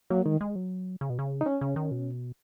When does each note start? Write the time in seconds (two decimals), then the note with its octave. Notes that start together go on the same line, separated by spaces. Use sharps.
0.10 F#3 A#3
0.26 D#3 G#3
0.41 G#3
0.56 F#3
1.01 C#3
1.10 B2
1.19 C#3
1.41 D#4
1.46 C#4
1.61 C#3
1.76 D#3
1.91 B2